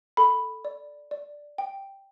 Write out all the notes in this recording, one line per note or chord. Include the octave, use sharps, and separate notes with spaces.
A4 B5
D5
D5
G5